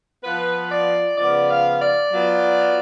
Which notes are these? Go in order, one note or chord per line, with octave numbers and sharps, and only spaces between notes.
F3 B3 F4 B4
D5
C#3 F3 B3 F4 D5
F5
D5
F#3 B3 F4